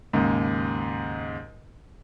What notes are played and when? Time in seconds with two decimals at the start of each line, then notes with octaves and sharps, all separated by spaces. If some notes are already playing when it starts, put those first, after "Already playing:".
0.13 D#2 G#2 C#3